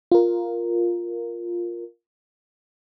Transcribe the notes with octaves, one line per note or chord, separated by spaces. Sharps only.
F4 A#4